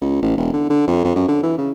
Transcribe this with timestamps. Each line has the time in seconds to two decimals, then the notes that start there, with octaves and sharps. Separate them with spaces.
0.01 C#2
0.22 A1
0.37 E1
0.53 D3
0.70 D3
0.87 F2
1.04 F2
1.16 F#2
1.28 D3
1.43 E3
1.58 C#3